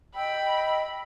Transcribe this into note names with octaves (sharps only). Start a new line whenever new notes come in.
D#5 G5 B5 E6